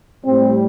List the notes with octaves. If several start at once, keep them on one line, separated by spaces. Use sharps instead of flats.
A2 G3 C4